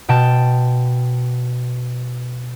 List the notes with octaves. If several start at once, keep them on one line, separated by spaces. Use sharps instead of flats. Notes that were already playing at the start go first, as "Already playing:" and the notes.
B2 G5 A5